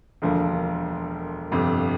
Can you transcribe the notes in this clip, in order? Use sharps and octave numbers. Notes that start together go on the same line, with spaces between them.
E1 D2 D3 F3 A#3
G1 F2 C3